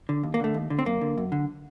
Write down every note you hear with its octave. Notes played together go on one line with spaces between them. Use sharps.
D3
D#2
A#3
D3 A3
D#2
D3
C4
F#2 A#3
D3
F#2
D3